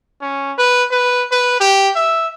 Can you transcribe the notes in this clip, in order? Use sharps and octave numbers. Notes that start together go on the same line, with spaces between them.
C#4
B4
B4
B4
G4
E5